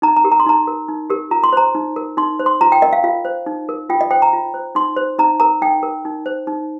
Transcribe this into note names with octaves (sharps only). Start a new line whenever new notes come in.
D#4 A#5
A#5
G4 A#4
A#5
C6
D#4 A#5
A#4
D#4
G4 A#4
F4 A#5
C6
C5 A#5
D#4
A#4
D#4 C6
C5
C6
F4 A#5
G5
A#4 D#5
F5
F4 F5
C5
D#4
A#4
F4 G5
D#5
C5 G5
A#5
F4
C5
D#4 C6
C5
D#4 A#5
A#4 A#5
D#4 G5
A#4
D#4
C5
D#4